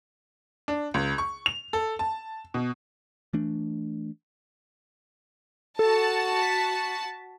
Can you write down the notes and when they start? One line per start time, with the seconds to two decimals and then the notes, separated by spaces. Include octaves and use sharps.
0.68 D4
0.94 C#2
1.18 C#6
1.46 F7
1.73 A4
1.99 A5
2.54 B2
3.33 E3 A3 D4
5.79 F#4 A4 A5
6.42 B6